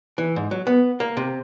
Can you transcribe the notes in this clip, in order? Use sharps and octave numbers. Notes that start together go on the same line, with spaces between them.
E3
G#2
F#3
B3
A#3
C3